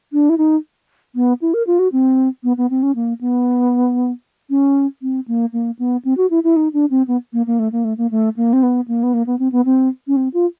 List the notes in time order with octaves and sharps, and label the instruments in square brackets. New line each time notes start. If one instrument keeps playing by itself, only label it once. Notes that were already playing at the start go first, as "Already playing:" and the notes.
[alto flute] D4
E4
D#4
B3
E4
A#4
F4
F#4
C4
B3
B3
C4
C#4
A#3
B3
C#4
C4
A#3
A#3
B3
C4
F#4
E4
E4
D#4
D4
C4
B3
A#3
A#3
A3
A#3
A3
A#3
A3
A#3
C4
B3
A#3
B3
A#3
B3
C4
B3
C4
C#4
C4
F4